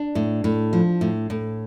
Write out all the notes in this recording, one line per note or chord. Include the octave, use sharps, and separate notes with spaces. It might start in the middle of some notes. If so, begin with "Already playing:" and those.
Already playing: D4
A2
A2
F3
A2
A2